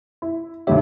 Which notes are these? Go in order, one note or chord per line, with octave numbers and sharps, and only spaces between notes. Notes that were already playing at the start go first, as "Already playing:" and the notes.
E4
D2 G2 D#3 G4 C#5 E5